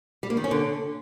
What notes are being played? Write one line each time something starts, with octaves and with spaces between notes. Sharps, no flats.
G3
A#3
D#3
C#4
D3